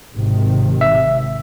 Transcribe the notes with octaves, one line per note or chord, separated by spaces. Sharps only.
G#1 C3 D#3
E5